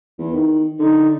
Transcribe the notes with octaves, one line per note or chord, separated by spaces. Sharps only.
E2
D#3
D3 D#4